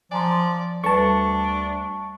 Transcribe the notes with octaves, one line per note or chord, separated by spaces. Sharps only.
F3 D5 G#5 A#5 C6
D2 G3 D4 A4 B4 A5 C#6